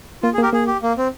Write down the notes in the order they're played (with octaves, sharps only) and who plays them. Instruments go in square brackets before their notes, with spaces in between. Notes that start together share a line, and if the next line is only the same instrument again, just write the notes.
[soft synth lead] A#3 [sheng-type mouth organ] F4
[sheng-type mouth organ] G#4
[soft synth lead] A#3
[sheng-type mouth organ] G4 A#4
[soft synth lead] A#3 [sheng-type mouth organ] G#4
[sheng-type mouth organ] G4
A#3
C4